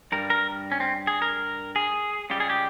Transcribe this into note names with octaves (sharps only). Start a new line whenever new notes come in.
G2 G3 A#4
A#4
C#4
C4
G#4
A#4
G#4
C#2 C#3 G3 G4
G#4
G4